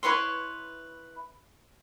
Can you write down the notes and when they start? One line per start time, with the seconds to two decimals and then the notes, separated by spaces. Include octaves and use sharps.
0.03 E4 B4 C#5 C6